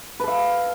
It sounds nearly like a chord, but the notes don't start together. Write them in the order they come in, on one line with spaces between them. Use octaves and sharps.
B4 A4 F5